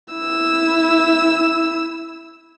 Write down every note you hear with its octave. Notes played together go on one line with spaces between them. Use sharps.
E4 E6